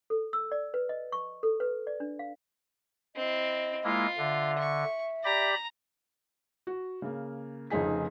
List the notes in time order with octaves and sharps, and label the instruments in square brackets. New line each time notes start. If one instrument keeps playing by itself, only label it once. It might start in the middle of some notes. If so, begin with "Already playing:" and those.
[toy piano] A4
E6
D5
B4
D#5
C#6
A4
B4
D5
D4
F5
[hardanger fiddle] C4 E4 [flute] D#5
[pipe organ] G#3 A#3 E4 [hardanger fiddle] F4
[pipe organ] D3 [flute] E5
[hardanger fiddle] C#6
[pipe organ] G4 D5 B5 [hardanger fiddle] A#5
[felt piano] F#4
C#3 A#3
F1 F2 C#3 D#4 G#4 B6